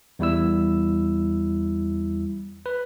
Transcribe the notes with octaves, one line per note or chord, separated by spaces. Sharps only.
E2 G3 E4 E6
B4